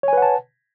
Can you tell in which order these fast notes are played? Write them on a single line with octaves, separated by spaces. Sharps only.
C#5 G#5 B4 F#5 A5